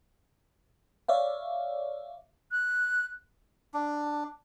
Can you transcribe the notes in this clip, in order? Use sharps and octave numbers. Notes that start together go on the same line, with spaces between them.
C#5 D5 E5 F5
F#6
D4